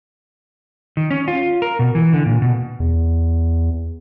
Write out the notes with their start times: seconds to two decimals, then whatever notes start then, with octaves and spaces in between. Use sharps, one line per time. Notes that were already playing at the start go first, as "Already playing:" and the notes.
0.97 D#3
1.10 C#4
1.28 F4
1.62 A#4
1.79 B2
1.95 E3
2.13 D3
2.26 A#2
2.42 B2
2.80 E2